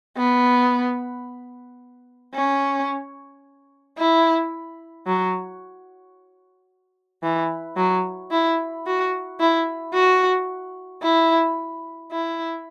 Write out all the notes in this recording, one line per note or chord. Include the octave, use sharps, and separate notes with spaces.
B3
C#4
E4
F#3
E3
F#3
E4
F#4
E4
F#4
E4
E4